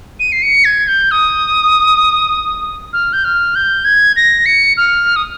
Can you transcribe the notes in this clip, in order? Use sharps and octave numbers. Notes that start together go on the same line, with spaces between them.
D#7
C7
C#7
G#6
G6
D#6
F6
G6
F6
G6
G#6
A#6
C#7
F6
D#6